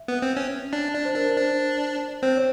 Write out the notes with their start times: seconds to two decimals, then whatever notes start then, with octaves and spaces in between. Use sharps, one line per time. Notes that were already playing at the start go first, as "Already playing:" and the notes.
Already playing: E5
0.08 B3
0.22 C4
0.37 C#4
0.73 D4
0.94 D4 D5
1.05 C5
1.15 D4 A#4
1.27 A#4
1.36 D4 C5
2.23 C4 C5
2.37 C#5